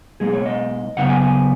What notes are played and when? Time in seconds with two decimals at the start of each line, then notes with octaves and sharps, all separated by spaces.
0.20 B2 G#3 D#4 G#4
0.33 C#5
0.46 D#5
0.97 F#2 C#3 B3 D#4 F#5
1.09 G#5
1.22 G#5